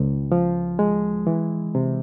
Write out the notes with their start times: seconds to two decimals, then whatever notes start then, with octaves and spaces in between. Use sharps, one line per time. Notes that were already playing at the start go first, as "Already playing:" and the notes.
Already playing: C#2
0.32 F3
0.79 G#3
1.27 E3
1.75 C3